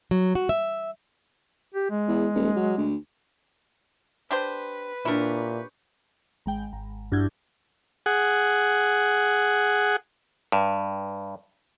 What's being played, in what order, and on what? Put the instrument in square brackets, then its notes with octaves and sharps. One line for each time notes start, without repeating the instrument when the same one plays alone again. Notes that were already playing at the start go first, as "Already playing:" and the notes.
[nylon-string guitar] F#3
F#4
E5
[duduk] G4
G#3
[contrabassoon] E2
D#1
F#3
D2
[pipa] D4 G4 C5 [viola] B4
[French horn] A#2 [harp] D4 G4 C#5 [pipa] E4 A#4
[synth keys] G#1 G#3 G5
G#1
G2 D4 E4 F#4 G6 G#6
[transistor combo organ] G#4 F#5
[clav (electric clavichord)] G2